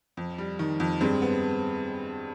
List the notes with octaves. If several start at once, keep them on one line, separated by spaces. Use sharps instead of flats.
F2
G3
D#3
F2
G2 G#3 C4
B3